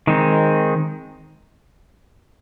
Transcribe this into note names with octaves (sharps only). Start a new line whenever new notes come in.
D#3 G#3 C4 D#4